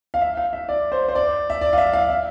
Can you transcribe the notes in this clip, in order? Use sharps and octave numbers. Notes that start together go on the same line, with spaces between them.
F5
E5
F5
E5
D5
C5
C5
D5
E5
D5
F5
E5
F5
E5